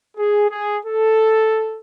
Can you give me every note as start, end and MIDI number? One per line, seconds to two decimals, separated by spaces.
0.17 0.47 68
0.50 0.78 68
0.86 1.79 69